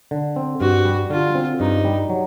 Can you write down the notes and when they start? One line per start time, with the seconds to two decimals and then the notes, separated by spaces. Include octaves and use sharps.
0.11 D3
0.36 C4
0.61 G2 F#4
0.85 G3
1.10 D3 F4
1.35 C4
1.60 G2 D#4
1.85 G3
2.09 F#3